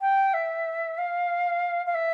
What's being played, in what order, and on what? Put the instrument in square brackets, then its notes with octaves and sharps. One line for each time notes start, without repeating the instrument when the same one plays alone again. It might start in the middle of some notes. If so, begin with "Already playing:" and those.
[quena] G5
E5
F5
F5
E5